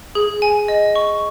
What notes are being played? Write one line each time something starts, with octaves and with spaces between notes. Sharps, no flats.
G#4
G#5
D#5
C#6